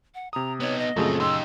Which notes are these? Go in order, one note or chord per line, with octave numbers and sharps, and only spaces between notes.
F#5
C3 A#5 D#6
B3 D#4 C#5
D#5
F#2 A#2 C#3 F3 A3 C4 G#4
D#4 G4 C6 E6